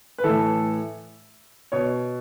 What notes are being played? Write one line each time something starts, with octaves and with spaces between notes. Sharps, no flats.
B4
A2 E3 A4
B2 C#5